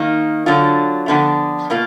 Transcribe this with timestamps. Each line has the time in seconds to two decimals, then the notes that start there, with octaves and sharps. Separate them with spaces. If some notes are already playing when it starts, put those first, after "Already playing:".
Already playing: D#3 A#3 D#4
0.46 D3 F#3 D4 F4
1.08 D3 F3 B3 D4
1.70 B2 A#3 F4